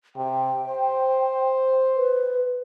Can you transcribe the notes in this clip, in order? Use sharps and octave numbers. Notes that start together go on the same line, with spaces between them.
C3 G5
C5
B4